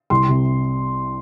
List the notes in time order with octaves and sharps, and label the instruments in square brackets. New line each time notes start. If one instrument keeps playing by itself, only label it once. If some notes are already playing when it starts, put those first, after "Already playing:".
[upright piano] C2 C6
C3